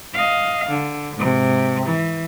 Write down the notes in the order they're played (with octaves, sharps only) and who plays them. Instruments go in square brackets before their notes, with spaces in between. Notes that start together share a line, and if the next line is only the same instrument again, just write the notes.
[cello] D#5 F5
D3
G#2 C3
E3